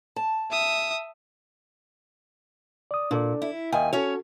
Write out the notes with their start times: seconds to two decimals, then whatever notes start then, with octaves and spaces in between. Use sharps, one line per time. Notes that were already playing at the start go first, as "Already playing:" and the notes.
0.16 A5
0.51 E5 D#6
2.91 D5 D#6
3.11 A#2 D4 A4 D5
3.42 E4
3.72 D#2 D#5 F5 G5 G#5
3.93 C#4 F#4 A4 C#5